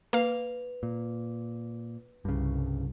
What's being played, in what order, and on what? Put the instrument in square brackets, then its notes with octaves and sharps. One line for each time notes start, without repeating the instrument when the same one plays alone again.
[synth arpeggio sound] A#3 F5 [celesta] B4 F7
[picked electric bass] A#2
[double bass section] C2 [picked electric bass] G2 C#3